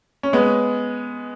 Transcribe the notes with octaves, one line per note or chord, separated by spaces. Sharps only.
C#4
G#3 B3